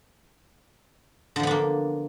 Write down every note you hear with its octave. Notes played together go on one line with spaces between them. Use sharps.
D3 F3 A#3 B3 D4